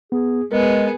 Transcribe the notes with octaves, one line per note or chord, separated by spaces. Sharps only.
B3 G#4
G#3 B3 G#4 A#4